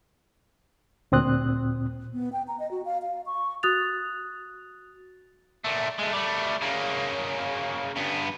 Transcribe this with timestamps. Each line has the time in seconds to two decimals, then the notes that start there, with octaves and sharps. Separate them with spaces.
1.12 D2 A#2 C4 D#6 F#6
2.13 B3
2.33 G5
2.48 A#5
2.60 D#5
2.71 F#4
2.85 F5
3.02 F5
3.26 C#6
3.63 F#4 D#6 F#6 A6 F7
5.64 A#2 A3
5.99 G#3 A3
6.13 G3 A3
6.61 C#3 A#3
7.97 G2 B3